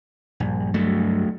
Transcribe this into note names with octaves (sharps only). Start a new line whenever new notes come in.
A#1 G2
D2 F#3 A3